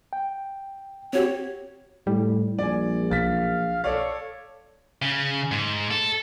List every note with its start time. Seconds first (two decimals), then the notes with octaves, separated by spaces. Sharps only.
0.13 G5
1.13 C4 F#4 G4 C#5
2.07 A2 G3
2.59 A#1 D5 G#5
3.11 B1 F5 A6 B6
3.84 A4 C#5 D5 F5
5.02 C#3
5.52 G#2
5.91 A4